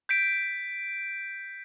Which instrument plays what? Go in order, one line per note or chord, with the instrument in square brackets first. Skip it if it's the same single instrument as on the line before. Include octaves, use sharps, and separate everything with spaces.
[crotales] G6 B6 D7